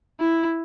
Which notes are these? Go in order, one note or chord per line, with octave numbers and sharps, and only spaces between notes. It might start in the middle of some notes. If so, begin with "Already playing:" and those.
E4